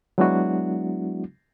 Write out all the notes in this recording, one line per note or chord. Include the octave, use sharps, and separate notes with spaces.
F#3 G#3 B3 D4 E4 F#4